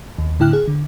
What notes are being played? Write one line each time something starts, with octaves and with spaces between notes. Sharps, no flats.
D#2
A2 D3 E4 G5 F6 F#6
G#4
D3